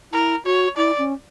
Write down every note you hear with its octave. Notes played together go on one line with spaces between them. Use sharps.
E4 A#4
F#4 C#5
E4 D5
C#4